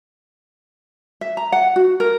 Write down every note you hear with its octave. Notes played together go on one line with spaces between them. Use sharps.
E5
A#5
F#5
F#4
A#4